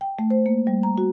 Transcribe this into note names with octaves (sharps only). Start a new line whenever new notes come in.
G5
A3
C5
A#3
G3
A#5
F#4